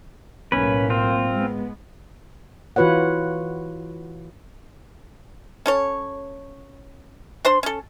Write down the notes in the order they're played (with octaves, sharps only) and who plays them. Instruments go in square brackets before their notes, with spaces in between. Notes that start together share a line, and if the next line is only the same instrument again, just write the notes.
[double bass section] B1 A2 A#3 [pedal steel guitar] C#4 B4
[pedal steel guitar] C4 F4
[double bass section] G#3 B3
[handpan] E3 F4 F#4 B4 C#5 F#5
[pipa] C#4 A4 C#5
D4 C5 C6
C#4 A4